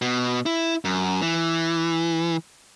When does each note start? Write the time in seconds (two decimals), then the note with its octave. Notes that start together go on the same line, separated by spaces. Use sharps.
0.02 B2
0.46 E4
0.85 F#2
1.22 E3